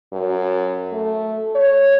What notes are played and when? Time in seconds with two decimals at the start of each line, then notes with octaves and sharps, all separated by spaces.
0.13 F#2
0.93 A3
1.55 C#5